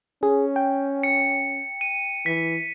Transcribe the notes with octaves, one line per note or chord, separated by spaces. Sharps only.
C#4 G#4
G5
C#7
D#7
E3 B6